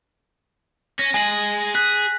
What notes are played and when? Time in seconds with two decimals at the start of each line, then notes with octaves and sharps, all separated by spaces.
0.99 C#4 A#6
1.14 G#3 G#4 G#5 F#7
1.75 G#4 F#6 B6